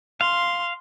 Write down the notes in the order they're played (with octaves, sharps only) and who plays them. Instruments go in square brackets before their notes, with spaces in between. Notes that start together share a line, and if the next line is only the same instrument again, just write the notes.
[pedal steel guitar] F5 [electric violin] C6